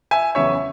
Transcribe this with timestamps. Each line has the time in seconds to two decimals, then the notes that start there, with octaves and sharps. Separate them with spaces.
0.11 E5 G#5
0.35 F#1 E2 C#3 E3 C#5 E5